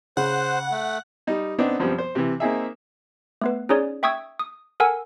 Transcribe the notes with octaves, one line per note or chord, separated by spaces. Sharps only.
C#3 C5 F#5
A3
G3 D#4
B3 C4 D4 D#4
F#2 F3 G3 B3 C4
C5
C3 E3
A#3 C4 D#4 G#4 E5
A3 B3 B4
C#4 D#4 G#4 C#5 D5
E5 G5 C#6 D#6 E6 G#6
D#6
A4 A#4 F#5 G#5 E6